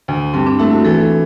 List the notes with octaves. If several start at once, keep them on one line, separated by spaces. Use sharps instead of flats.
D2
G2 C4
D4
A3 E4
F#4
E3 A4